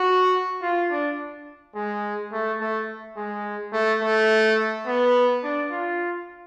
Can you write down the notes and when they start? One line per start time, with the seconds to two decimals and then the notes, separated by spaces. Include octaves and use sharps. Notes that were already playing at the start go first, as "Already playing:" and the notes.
Already playing: F#4
0.62 F4
0.91 D4
1.76 G#3
2.32 A3
2.60 A3
3.17 G#3
3.73 A3
4.02 A3
4.87 B3
5.43 D4
5.71 F4